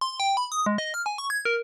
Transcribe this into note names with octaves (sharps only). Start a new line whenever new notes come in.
C6
G5
B5
D#6
G#3
D#5
F6
G#5
C#6
G#6
A#4